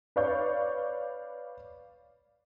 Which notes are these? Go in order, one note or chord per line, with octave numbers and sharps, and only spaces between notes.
B4 C#5 D5 F5 C#6 G6